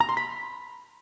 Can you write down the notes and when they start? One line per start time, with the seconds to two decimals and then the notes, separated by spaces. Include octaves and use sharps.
0.01 A#5
0.09 C6
0.17 B5